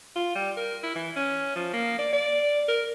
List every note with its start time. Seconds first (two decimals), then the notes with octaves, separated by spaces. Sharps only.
0.16 F4
0.35 G3
0.57 A#4
0.83 E4
0.95 E3
1.16 C#4
1.56 F3
1.73 A#3
1.99 D5
2.13 D5
2.68 A#4